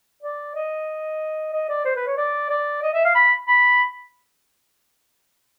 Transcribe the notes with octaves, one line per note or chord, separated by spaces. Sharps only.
D5
D#5
D#5
D5
C5
B4
C#5
D5
D5
D#5
E5
F5
B5
B5